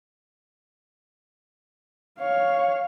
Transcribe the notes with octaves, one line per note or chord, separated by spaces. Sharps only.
C#5 F5